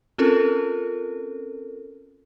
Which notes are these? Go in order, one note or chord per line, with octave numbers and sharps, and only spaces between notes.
C4 C#4 F4 A4 A#4